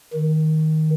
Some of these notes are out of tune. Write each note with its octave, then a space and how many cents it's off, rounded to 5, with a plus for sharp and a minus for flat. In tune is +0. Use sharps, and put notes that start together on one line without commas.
D#3 +10